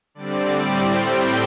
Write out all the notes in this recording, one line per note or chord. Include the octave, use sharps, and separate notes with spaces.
D3 G3 C4 D5
A2 G3 C4 D5
A2 G3 C4 G5